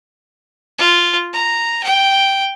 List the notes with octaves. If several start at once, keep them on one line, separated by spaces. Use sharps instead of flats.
F4
A#5
G5